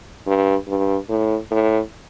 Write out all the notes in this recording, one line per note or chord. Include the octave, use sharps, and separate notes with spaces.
G2
G2
A2
A2